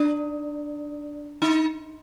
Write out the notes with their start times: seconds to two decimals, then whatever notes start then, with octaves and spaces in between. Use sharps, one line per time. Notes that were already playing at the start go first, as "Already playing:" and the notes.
Already playing: D4
1.42 D#4